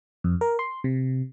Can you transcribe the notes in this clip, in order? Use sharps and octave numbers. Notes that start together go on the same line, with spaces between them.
F2
A#4
C6
C3